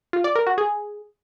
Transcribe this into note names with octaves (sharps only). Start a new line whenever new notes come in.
F4
D5
A#4
F#4
G#4